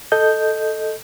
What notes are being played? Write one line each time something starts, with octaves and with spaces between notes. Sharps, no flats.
A4 D#5 G6